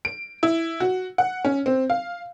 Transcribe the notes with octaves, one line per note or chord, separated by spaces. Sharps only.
D7
E4
F#4
F#5
C#4
C4
F5